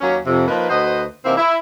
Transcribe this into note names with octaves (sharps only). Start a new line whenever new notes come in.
D#2 F#3 A#3 C#4
F2 C3
F3 A#3 D#4 B4
D2 F#4 B4 C5 D#5
C3 E3 A#3 C4 D#4 E4
E4